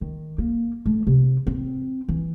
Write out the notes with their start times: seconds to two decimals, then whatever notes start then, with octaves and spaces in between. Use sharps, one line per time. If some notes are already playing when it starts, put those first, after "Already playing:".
0.01 D#3
0.38 A#3
0.86 A3
1.07 C3
1.47 C4
2.09 E3